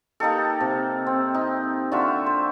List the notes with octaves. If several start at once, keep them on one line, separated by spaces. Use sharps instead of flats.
A#3 D#4 G4 A4
C3
C4
D#4
D3 F4 F#4 E5
C5